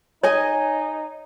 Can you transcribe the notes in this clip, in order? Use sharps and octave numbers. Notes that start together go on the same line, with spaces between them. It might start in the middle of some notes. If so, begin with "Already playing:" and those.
D#4 G#4 C#5 D#5 G#5